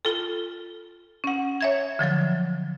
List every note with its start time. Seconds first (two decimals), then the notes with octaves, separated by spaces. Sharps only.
0.05 F4 A4
1.24 C#4 F#5
1.61 C#5 E5 G#6
1.99 D3 F3 F#3 A6